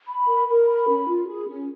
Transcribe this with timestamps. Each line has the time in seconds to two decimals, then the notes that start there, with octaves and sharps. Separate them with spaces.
0.08 B5
0.27 A#4
0.48 A#4
0.67 B5
0.88 C#4
1.08 F4
1.28 G#4
1.48 C#4